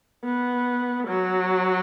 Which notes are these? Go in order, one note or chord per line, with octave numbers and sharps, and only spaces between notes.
B3
F#3